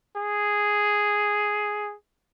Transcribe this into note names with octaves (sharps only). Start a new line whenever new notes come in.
G#4